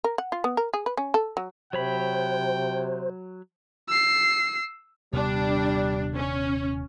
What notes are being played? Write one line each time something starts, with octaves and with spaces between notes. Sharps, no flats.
A#4
F#5
F4
B3
A#4
G#4
B4
C#4
A4
F#3
C3 F#3 C5 C#5 G5 B5
E6 C7
D#1 C3 G3 B3 D4
C#4